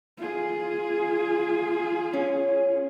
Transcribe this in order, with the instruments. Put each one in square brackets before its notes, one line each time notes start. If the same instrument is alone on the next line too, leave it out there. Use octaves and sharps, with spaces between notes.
[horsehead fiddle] F4 G#4
[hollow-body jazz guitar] C#4